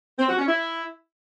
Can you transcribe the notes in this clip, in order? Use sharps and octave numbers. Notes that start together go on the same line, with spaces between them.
C4
F#4
C#4
E4